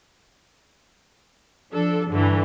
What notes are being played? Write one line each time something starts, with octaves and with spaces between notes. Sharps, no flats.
F3 D4 A4
G2 D3 E3